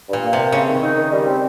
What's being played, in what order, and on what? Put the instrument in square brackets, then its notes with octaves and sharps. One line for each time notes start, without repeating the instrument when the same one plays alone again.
[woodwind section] G2 [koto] A#2
[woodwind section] A#3
[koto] C3
[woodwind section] A#3
[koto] C#3 [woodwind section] C4
[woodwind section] D#3
D#4
D#3
G3
C4